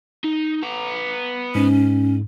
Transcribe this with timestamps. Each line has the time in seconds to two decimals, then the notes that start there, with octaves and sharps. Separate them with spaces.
0.24 D#4
0.63 B3 A#5
1.55 G#2 C#4